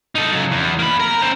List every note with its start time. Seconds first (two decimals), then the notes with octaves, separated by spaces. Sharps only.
0.15 D#4 A4
0.32 C#3 F#3
0.51 E2
0.79 A#3 B5
1.00 A#4 A#5
1.22 C#4 C5